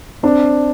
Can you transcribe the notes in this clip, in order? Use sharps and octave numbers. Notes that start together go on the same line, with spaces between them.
C4 D4